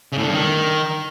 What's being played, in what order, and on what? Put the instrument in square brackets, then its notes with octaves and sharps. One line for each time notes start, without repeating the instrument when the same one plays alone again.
[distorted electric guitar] C#3
A2
D3
G2
D#3